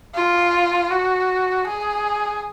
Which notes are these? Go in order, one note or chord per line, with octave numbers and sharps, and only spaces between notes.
F4
F#4
G#4